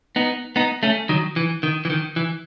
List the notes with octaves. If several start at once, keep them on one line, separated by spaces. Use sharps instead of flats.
B3 D#4
B3 D#4
A3 C#4
D#3 F#3
E3
D#3
E3
D#3
E3